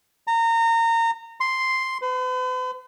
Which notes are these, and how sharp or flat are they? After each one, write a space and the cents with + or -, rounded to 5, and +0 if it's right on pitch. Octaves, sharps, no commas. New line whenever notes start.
A#5 -25
C6 +0
B4 +45